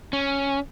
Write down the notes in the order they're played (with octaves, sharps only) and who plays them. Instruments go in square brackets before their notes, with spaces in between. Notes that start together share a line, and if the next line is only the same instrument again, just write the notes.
[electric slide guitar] C#4